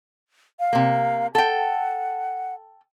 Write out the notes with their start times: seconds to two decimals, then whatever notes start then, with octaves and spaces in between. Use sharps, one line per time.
0.60 F5
0.73 C3 A#3
1.35 A4 F#5 G5